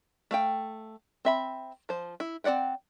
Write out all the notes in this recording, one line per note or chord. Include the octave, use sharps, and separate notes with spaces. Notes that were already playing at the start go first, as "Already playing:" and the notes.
A3 F5 G5
C4 E5 B5
F3 C5
E4
C4 F#4 D5 F#5 G5